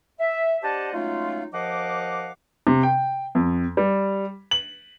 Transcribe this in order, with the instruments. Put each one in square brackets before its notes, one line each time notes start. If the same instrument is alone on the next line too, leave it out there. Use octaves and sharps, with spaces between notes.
[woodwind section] E5
D4 G4 C5 D#5 F#5 A5
F#3 G#3 A3 C#4 D#4 F4
D#2 F3 D#5 F5 F#5 D6
[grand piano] C3
G5
F2
G3
F#7